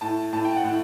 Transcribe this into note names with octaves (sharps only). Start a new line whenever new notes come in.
A2 A5
A2 A5
G5
F#5
A2